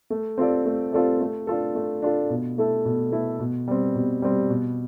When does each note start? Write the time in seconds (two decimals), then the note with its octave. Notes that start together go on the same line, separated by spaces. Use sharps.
0.10 A3
0.38 C4 F4 A4 D5
0.66 A3
0.93 C4 F4 A4 D5
1.21 A3
1.47 D4 F4 A4
1.75 A3
2.02 D4 F4 A4
2.30 B2
2.58 A3 E4 A4
2.85 B2
3.12 A3 E4 A4
3.39 B2
3.68 G3 C4
3.95 B2
4.22 G3 C4
4.50 B2